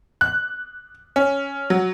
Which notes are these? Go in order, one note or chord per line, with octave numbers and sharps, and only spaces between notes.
F#6
C#4
F#3